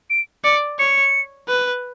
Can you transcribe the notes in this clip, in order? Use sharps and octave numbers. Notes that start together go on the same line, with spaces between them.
D7
D5 C#7
C#5 C#7
B4